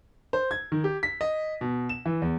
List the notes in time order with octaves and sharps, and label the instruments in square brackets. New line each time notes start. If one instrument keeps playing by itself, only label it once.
[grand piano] C5
G#6
D#3
G4
B6
D#5
B2
E7
E3
E2